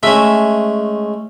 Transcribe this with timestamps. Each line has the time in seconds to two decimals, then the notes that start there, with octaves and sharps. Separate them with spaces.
0.03 G#3 A3 C#4 E5